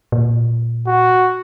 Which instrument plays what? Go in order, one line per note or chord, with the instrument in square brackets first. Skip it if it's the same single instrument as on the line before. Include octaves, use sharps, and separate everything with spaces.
[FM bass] A#2
[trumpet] F#4